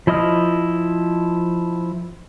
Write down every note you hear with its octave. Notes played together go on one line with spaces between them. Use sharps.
F3 E4 D#5 D#6 F6